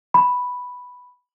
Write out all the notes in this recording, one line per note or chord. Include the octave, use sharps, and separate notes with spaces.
B5